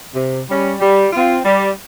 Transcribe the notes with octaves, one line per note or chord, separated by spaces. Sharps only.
C3
G3 C#4
G3
C4 F4
G3